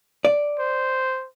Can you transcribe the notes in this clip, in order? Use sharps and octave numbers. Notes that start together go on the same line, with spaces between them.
D5
C5